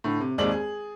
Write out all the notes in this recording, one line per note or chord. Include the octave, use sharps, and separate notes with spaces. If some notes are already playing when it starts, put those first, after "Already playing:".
A2 D3
C3
G#1 D#2 D#3 G#3 D5 F#7
G#4